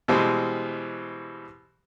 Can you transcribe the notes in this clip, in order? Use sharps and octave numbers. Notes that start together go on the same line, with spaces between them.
B2 E3 G3 G#3 C4